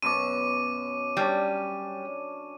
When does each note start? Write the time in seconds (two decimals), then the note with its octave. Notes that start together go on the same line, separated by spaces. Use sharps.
0.02 F#2 B2 D6 D#7
1.17 G3 C#4 D4